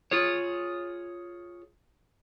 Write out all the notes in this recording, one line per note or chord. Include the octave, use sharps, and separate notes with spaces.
F4 G#4 C#5